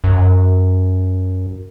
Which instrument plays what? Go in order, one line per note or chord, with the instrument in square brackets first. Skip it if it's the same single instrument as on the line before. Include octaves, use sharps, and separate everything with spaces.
[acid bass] F#2